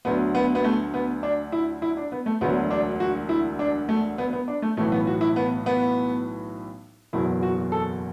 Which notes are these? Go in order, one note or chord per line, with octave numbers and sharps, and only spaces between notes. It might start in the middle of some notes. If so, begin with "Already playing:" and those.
D2 D3 F#3 B3
B3
B3
A3
B3
D4
E4
E4
D4
B3
A3
E1 D2 D3 F#3 B3
D4
F#4
E4
D4
A3
B3
B3
D4
A3
B1 A2 E3 A3
B3
F#4
E4
B3
B3
F#1 E2 B2 F#3 E4
F#4
A4